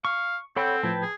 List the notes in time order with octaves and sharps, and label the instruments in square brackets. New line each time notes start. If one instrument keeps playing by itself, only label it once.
[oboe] F5 [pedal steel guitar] C#6
[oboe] C4 [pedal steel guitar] A4 F#5 G5 [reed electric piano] C#5 B5
[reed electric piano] A2 F3 G#6 [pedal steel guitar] B4 G5 A5
[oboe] G#4